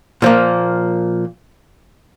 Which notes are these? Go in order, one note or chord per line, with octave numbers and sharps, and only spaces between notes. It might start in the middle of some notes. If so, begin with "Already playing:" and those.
A#2 F3 A#3